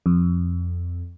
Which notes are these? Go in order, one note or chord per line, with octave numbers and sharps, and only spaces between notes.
F2